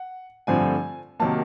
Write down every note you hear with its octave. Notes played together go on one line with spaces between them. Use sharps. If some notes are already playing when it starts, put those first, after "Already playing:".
Already playing: F#5
G2 D3 F3 A3 C4 G#5
C3 D#3 F#3 A#3 A5